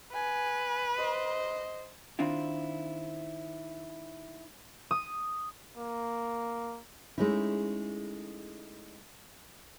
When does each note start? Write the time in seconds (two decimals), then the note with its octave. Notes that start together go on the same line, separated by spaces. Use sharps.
0.14 B4 G#5
0.97 C5 D#5
2.19 D#3 C4 D4 E4 F4
4.91 D#6
5.78 A#3
7.18 G#3 A3 C#4 D#4 E4